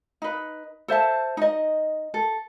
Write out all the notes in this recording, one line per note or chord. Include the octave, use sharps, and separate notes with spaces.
D#4 B4
A4 C5 E5 A5
D#4 D#5
A4